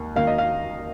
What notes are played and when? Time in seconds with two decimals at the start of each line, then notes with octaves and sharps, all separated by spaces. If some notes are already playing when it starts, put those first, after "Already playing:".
Already playing: D#2 D#3 A#3
0.16 D#2 D#3 A#3 F5
0.27 D#5
0.38 F5